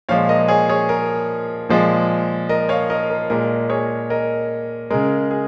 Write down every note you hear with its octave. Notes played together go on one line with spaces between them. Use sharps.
A#2 F3 G#3 C#5 F5
A#4 D#5
G#4 C#5
G#4 C#5
A#4
A#2 F3 G#3
A#4 D#5
C#5 F5
A#4 D#5
A#4
A#2 G#3 A#4
G#4 C#5
A#4 D#5
C#3 G#3 A#4
G#4